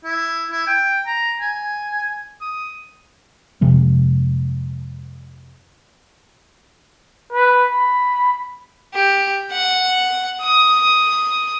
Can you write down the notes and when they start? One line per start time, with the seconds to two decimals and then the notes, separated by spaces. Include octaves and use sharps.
0.05 E4
0.51 E4
0.67 G5
1.06 A#5
1.40 G#5
2.41 D#6
3.61 F2 C3 F3 G#3
7.33 B4
7.71 B5
8.94 G4
9.52 F#5
10.41 D#6